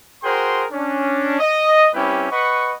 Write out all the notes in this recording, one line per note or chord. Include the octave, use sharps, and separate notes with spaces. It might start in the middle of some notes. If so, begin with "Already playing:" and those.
F#4 G#4 A#4 C5 G5 C6
C#4 D4
D#5
G3 C4 C#4 E4 G4 B4
B4 D#5 F#5 B5 C#6